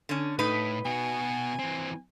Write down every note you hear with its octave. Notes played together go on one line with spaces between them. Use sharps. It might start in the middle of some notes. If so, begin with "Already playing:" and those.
D3 C#4
A2 D#4 B4
B2 F#4 G#5
E3 C4